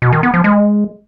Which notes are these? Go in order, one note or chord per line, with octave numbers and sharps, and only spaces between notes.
B2
D#3
B3
F3
G#3